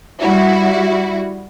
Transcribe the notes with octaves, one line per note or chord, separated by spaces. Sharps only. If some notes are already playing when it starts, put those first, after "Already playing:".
G3 E4 F#4